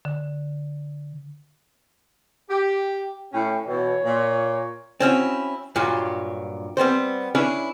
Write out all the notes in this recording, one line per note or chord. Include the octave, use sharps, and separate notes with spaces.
D3
G4
A2 C#4 G5
B2 E3 C#5
A#2
C4 C#4 E4 F#4
G2 A#2 F#3 F4
G3 B3 C4 C5
C#4 D4 E4 G#4 B4